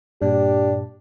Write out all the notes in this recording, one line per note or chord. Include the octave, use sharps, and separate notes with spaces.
G2 A#2 D4 G4